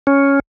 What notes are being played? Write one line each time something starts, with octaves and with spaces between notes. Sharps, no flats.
C#4